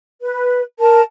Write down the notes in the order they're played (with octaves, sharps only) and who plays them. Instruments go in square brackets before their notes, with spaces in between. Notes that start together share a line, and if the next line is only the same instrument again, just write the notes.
[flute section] B4
[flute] A#4 [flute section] A5